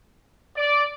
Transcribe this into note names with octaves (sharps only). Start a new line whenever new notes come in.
D5